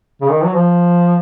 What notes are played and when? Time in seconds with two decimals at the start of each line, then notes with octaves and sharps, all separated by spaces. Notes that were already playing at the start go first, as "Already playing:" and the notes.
0.21 C#3
0.30 D#3
0.44 F#3
0.53 F3